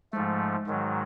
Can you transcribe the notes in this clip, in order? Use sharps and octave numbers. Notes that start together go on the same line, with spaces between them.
G#2 F3 G#3 A3
G#2 D#3 F#3